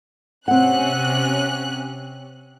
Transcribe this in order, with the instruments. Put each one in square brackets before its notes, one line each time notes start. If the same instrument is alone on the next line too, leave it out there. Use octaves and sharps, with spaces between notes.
[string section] C3 C#4 F#6 [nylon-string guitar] C4 F#5